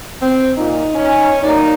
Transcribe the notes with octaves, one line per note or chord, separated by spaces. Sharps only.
C4
A#2 D#4
C#4
F#3 A#3 D#4 D5